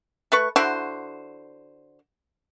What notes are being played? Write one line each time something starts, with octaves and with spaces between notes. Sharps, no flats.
A3 B4 C#6
D3 E4 F#4 C5